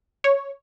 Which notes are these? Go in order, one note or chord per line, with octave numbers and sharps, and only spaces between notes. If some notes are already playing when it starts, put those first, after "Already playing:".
C#5